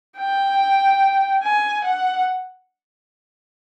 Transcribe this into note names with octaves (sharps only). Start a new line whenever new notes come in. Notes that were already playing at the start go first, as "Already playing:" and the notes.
G5
G#5
F#5